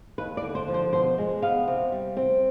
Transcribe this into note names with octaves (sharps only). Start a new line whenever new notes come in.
D#2 B4
D5
D3
C5
F3
C5
B2 C5
G#3
B3 F5
C3
G3
C4